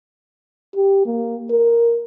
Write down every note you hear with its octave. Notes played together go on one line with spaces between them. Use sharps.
G4
A#3
A#4